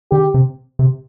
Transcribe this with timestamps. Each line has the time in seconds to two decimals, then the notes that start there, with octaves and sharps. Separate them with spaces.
0.11 D3 G4
0.34 C3
0.79 C3